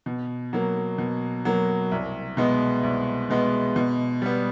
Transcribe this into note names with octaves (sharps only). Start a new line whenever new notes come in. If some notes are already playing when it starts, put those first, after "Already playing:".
B2
F#3 A#3
B2
F#3 A#3
C2
B2 G#3 B3
C2
B2 G#3 B3
B2
G3 B3